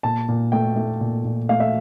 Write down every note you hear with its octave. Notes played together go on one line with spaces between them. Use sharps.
A#2 A5
A#2
A3 G5
A3
A#2
A#2
A3 F5
E5